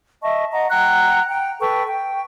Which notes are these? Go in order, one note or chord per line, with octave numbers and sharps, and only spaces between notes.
D#5 E5 A5 C#6
D#5 F#5 A#5
F#5 G5 A#5 F#6
G5
A4 B4 G5 C#6
G5